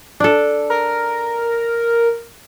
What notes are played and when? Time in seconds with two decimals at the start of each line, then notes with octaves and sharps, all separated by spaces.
0.20 D4 A4
0.70 A#4